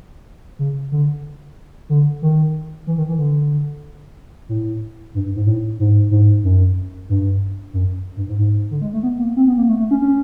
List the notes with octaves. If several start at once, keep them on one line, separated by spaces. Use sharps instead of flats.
C#3
D3
D3
D#3
E3
D#3
E3
D3
A2
G2
G2
G#2
A2
G#2
G#2
F#2
G2
F#2
G2
G#2
G#2
D3
G#3
A3
B3
A#3
C4
B3
A#3
A3
A3
C#4
C#4